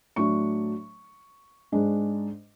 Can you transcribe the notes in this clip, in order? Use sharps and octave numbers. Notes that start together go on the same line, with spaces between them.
A2 F#3 A3 D4 C#6
G#2 G#3 D4